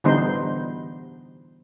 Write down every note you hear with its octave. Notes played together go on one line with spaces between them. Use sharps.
D3 E3 G3 B3 D#4 C5